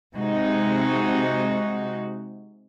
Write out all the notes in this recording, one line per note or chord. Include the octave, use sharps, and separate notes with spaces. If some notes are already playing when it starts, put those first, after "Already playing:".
C3 G#3 D#4 F#4